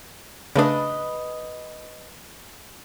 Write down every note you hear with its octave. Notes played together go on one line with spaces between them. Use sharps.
C#3 A3 D4 B4 D#5